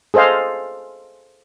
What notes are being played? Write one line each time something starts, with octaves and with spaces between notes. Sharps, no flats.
G#4 A4 C5 D#5 F5